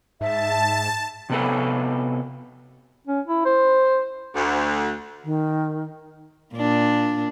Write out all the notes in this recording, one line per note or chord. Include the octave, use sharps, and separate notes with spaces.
G#2 E5 A5
C3 B3 A4
C#4
E4
C5
D2
D#3
A#2 D4